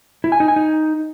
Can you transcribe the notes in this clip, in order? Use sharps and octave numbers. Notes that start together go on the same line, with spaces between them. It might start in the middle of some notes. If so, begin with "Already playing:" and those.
E4
G#5
D#4
G#5
D#4